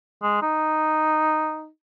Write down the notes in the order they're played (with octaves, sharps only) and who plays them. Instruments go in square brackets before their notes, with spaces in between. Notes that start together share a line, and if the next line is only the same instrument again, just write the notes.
[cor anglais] G#3
D#4